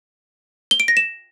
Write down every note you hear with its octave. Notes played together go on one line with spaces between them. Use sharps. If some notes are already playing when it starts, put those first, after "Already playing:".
G7
D7
A#6
E7